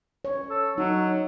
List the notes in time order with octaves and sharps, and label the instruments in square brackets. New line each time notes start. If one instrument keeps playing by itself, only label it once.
[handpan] C#5
[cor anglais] A4
[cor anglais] F#3 [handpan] D#4